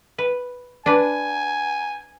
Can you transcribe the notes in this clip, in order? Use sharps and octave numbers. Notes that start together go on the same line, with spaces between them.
B4
D4 B4 G#5